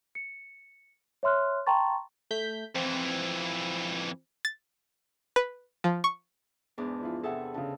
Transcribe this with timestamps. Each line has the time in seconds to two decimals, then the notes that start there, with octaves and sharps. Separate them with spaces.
0.15 C#7
1.23 C#5 E5 C6 F6 F#6
1.67 G5 A5 A#5 C6 C#6 A6
2.31 A3 G6 B6
2.75 F2 E3 C4
4.45 A6
5.36 B4
5.84 F3
6.04 C#6
6.78 E2 G#2 D4
7.01 F3 E4 F4
7.23 C3 G#4 A4 E5 F#5
7.54 C#3 D4 A5